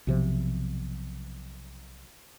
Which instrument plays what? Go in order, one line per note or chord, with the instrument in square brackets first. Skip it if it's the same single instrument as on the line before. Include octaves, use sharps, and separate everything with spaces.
[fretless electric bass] B1 C3 F3